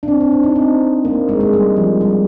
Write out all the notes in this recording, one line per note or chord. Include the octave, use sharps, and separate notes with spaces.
D4
C4
C4
D4
D#4
C4
A#3
G#3
G#3
G3
F3
G3